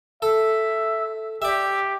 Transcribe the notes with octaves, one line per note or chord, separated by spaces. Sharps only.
A4 E5
G4 D5 E5